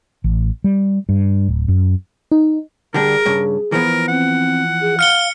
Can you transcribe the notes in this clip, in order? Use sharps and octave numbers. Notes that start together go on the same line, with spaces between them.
A1
G3
G2
D1
F#2
D#4
D3 G3 D4 G#4 A#4
G2 C#3
E3 F3 B3 A#4
C4 F#5
G#4
F5 F6 C#7 G7